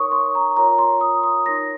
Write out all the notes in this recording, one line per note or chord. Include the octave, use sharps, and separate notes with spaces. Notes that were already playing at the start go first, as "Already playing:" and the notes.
Already playing: D#4 A#4 C#5 C#6 D#6
C6
A#5
F4 A#4 C#5 A#5
C6
D#6
D#6
D#4 A#4 C#5 A#6